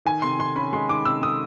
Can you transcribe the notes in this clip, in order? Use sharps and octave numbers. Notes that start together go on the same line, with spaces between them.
D#3 G#5
C3 C6
D#3 C6
C#4 B5
G#3 C6
D#3 D6
C3 E6
G#3 D#6